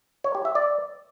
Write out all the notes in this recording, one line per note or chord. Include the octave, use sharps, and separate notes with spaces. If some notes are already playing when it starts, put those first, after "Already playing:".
C#5
G4
E5
D5